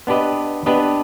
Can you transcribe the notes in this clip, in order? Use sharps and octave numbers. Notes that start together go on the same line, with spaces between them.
B3 D4 G4 B4 D#5
B3 D4 G4 B4 D#5